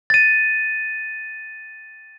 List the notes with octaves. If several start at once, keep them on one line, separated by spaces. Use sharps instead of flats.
A6 D#7